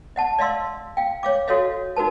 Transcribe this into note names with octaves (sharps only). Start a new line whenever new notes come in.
D#5 F#5 A5
D5 D#5 F5 C6 E6
F5 G5
C#5 F5 D6
F#4 A4 C#5 D#5 F5
D#4 F#4 A#4 B4 A5